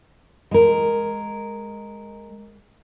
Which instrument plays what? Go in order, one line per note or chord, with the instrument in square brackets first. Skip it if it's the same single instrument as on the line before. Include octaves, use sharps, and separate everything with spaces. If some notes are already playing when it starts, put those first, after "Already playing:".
[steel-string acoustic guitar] G#3 A#4